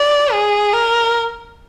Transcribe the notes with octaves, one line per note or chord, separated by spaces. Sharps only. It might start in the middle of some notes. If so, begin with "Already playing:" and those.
Already playing: D5
G#4
A#4